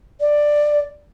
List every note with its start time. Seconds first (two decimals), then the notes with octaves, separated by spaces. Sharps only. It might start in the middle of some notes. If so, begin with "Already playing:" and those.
0.21 D5